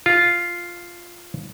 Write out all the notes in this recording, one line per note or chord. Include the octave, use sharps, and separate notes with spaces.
F4